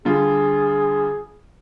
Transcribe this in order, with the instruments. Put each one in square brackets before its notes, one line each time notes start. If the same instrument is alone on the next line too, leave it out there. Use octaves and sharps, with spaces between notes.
[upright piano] D3 G3 F4 [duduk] G#4